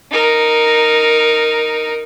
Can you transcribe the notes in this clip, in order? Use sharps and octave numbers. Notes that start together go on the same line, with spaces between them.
D#4 A#4